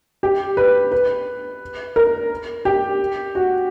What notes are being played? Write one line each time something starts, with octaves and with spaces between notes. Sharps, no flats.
G4
B4
B4
A#4
G4
F#4